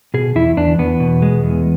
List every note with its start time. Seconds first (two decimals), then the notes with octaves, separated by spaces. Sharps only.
0.14 B2 G#4
0.36 E2 E4
0.57 E2 D4
0.78 E2 B3
1.00 B2
1.22 G#3
1.44 E2